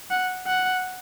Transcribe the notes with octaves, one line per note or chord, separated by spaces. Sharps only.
F#5
F#5